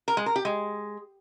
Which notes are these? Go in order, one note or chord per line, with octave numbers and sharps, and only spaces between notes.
A#4
G#3
A#4
G4
G#3